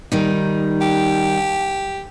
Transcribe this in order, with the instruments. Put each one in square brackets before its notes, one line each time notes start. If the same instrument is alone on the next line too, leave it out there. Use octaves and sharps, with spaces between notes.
[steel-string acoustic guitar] D#3 G3 D#4
[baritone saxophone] G4